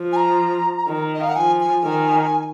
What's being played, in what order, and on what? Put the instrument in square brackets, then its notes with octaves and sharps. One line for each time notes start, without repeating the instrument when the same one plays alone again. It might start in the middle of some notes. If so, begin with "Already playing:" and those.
Already playing: [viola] F3
[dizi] G#5
A#5
[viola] D#3
[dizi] D#5
F5
F#5
[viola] F3 [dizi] G#5
[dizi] G#5
[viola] D#3